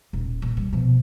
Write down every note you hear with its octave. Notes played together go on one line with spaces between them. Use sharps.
D#1
A#2
G3
B2 F3